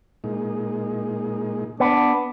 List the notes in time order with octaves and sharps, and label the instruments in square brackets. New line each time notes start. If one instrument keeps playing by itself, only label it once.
[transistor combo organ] A#2 G#3 D#4
[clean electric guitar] B3 [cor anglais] D4